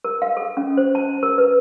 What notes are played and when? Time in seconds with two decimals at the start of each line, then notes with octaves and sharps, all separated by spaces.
0.04 A#4
0.22 F5
0.37 A4
0.57 C#4
0.77 C5
0.95 A5
1.23 A#4
1.38 B4